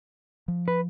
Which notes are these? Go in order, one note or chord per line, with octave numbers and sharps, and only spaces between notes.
F3
B4